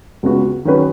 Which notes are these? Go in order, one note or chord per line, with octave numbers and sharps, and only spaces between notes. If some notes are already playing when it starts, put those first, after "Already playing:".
C#2 C#3 B3 F#4
D#3 F#3 C#4 G#4 B4